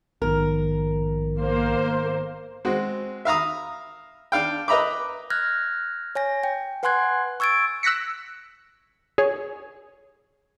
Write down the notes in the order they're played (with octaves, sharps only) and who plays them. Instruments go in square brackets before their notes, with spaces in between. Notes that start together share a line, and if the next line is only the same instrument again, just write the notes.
[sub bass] A#1 [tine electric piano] G#2 D#3 B3 [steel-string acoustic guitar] A#4
[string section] A#3 C5
[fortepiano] G#3 C4 F#4
E5 F5 A#5 D#6
D4 F5 G5
B4 D#5 E5 A#5 B5 D6
[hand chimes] F6 F#6 G#6 A#6
C#5 G#5 A#6
G5
B4 F#5 G#5 C6 F#6 G#6
C#6 E6 G#6 A6 D7
[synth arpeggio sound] E6 F#6 A#6 B6 C#7
G#4 C#5